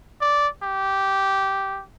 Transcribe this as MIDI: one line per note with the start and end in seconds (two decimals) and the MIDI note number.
0.21 0.48 74
0.63 1.82 67